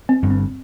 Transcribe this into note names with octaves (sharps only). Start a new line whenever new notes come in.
C4
G1 G2
C4